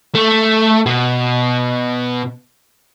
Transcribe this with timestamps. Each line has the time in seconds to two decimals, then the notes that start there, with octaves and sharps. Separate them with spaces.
0.15 A3
0.86 B2